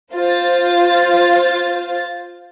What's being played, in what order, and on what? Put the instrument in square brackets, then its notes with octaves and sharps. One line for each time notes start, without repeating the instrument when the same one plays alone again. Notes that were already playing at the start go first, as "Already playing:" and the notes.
[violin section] F4 C5 A6